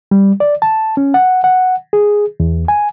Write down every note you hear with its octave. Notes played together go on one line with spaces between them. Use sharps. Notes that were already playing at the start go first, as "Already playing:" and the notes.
G3
D5
A5
C#4
F#5
F#5
G#4
E2
G#5